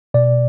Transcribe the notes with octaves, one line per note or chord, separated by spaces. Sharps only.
B2 D5